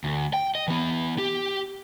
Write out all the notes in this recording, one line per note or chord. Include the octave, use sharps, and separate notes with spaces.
D2
G5
D#5
E3 B3
G4